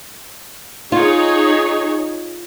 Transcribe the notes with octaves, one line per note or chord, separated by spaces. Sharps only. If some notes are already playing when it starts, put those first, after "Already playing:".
D#4 F4 G#4 C#5